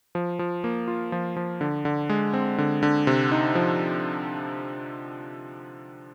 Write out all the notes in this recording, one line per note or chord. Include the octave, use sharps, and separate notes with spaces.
F3
F3
A#3
F4
F3
F3
D3
D3
G#3
C4
D3
D3
C3
D#4
F3